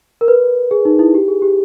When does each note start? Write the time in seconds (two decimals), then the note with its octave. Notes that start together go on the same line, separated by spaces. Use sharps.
0.21 A#4
0.28 B4
0.71 G#4
0.85 D#4
0.99 E4
1.15 G4
1.28 G#4
1.42 G4